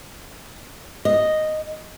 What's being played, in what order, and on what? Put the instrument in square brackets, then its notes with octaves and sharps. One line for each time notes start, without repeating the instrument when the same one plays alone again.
[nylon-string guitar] D#5